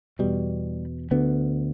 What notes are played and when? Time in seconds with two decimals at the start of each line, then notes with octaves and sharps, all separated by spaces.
0.19 E2 B2 G3
1.11 D2 D3 B3